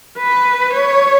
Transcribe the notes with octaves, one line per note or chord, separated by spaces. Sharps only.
B4
C#5